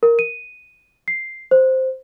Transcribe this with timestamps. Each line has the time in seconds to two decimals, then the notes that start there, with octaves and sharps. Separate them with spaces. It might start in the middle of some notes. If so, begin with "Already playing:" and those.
0.03 A#4
0.19 D#7
1.08 C7
1.51 C5